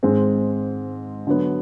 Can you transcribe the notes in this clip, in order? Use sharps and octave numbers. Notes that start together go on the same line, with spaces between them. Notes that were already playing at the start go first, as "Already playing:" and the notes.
G#2 D#3 G#3 C4
D3 F#3 B3